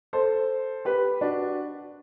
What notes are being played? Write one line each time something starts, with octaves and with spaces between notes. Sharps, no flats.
A4 C5
G4 B4
D4 F#4